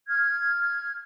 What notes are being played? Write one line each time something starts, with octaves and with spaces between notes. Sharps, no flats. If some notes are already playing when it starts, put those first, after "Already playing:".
F6 G#6